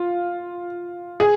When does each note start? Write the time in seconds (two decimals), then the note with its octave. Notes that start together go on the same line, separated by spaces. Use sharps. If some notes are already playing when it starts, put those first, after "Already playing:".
Already playing: F4
1.20 G#4